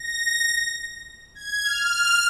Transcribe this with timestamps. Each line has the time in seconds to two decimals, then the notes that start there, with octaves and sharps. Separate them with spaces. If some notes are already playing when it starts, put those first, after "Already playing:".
Already playing: A#6
0.20 A#6
1.35 G#6
1.64 F6